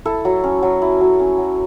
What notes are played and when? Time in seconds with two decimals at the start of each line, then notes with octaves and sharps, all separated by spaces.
0.05 E4 A4
0.25 F#3
0.44 C#4
0.62 F#3
0.82 E4
1.01 F#3
1.20 C#4
1.38 F#3